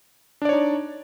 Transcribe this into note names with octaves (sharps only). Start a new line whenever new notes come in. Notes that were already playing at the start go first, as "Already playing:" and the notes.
D4 D#4 C#5 D5